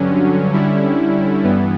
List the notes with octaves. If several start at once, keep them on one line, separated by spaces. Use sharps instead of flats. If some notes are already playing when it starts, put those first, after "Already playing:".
Already playing: G2 D3 F#3 C#4
D3 G3 C#4 E4
G2 E3 B3